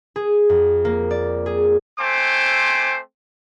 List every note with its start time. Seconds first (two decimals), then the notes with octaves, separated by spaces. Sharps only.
0.16 G#4
0.49 F2
0.85 A#3
1.11 D5
1.46 G#4
1.99 A3 C4 C5 G#5 D6